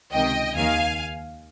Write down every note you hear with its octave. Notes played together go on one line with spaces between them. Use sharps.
C#2 C3 D#3 D#5 G5
D#2 D#3 F5 G#5